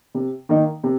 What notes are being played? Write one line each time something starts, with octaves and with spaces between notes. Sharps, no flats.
C3
D#3 A#3 D#4
C3